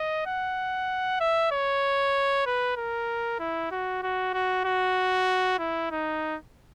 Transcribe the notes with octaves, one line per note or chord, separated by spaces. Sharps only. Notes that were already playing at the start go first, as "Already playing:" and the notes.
Already playing: D#5
F#5
E5
C#5
B4
A#4
E4
F#4
F#4
F#4
F#4
E4
D#4